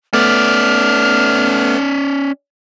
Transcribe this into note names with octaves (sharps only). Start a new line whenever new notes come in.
A3 B3 C#4 D5 F6